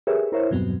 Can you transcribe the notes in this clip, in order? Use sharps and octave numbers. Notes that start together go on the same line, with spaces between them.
G4 G#4 A#4 B4 C#5 E5
E4 A#4 C5 C#5 E5
E2 G2 B2 F#3 B3 C4